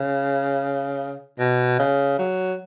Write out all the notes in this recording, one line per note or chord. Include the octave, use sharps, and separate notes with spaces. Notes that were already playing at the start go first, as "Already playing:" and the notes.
Already playing: C#3
B2
C#3
F#3